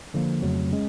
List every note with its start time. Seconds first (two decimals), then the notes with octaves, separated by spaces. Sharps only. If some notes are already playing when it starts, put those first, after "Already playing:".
0.14 D3 F3 A#3
0.42 F2 C#3 F#3 A3 C4
0.71 G#3 C#4